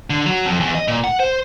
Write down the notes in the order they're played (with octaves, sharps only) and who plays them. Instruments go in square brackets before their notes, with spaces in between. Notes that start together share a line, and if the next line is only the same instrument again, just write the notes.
[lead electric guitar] D3
F#3
F2
E2
D#5
A#2
F#5
C5